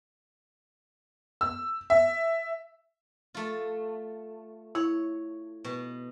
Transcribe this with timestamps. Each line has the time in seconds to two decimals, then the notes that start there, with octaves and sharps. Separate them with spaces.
1.41 E6
1.90 E5
3.34 A3 F4
4.75 E4 C#5
5.64 B2